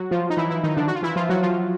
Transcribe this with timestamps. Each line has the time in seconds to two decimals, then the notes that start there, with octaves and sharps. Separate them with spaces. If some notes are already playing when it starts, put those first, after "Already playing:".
Already playing: F#3 F#4
0.11 F3 F4
0.30 D#4
0.37 E3 E4
0.50 E3 E4
0.63 D#3 D#4
0.77 D3 D4
0.88 F#4
0.95 F4
1.03 E3 E4
1.16 F3 F4
1.29 F#3 F#4
1.42 F3 F4